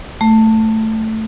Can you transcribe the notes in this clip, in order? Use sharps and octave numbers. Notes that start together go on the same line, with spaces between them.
A3